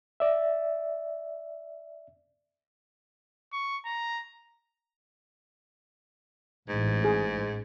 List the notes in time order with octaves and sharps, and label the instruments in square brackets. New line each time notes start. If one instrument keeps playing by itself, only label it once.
[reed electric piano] D5 E5
[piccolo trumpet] C#6
A#5
[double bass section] A1 [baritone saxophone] G#2
[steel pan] G#4